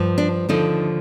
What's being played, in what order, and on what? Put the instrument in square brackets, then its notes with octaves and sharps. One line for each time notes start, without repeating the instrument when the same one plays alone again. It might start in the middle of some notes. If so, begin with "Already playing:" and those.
Already playing: [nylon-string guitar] G2 F3
D4
D#2 D3 F3 D#4